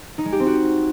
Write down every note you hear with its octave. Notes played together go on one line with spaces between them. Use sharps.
D#4
G#3
G4
C4
F#4